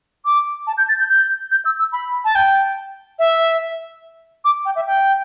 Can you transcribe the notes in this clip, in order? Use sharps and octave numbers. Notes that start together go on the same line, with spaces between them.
D6
A5
G6
A6
G6
G6
G6
E6
E6
B5
A5
G5
E5
D6
G5
E5
G5